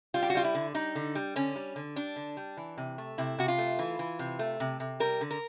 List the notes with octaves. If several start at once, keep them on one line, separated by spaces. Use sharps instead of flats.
G3 F4
G4
F#4
G3 F4
E4
D3
G3 D#4
D3
G3
D3 C#4
G3
D3
G3 D4
D3
G3
E3
C3
A3
C3 E4
C3 F#4
F4
A3
E3
E3
C3
A3
C3
C3
G3 A#4
D3
A#4